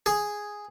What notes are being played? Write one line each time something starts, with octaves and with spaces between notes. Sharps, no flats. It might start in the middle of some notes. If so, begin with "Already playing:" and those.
G#4